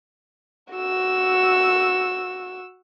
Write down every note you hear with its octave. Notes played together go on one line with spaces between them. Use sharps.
F#4 E6